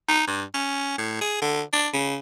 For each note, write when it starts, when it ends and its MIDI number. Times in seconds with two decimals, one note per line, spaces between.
0.08 0.25 63
0.27 0.44 43
0.54 0.98 61
0.98 1.20 45
1.21 1.40 68
1.41 1.62 50
1.73 1.88 62
1.93 2.19 49